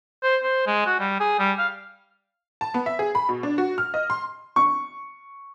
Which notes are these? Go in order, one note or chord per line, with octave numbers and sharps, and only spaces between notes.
C5
C5
G#3
F#4
G3
G#4
G3
F5
A5
B3
E5
G#4
B5
B2
D4
F#4
F6
D#5
C6
C#6